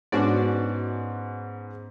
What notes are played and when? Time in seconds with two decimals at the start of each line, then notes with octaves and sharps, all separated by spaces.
0.12 G#2 B3 C#4 D4 F#4 D5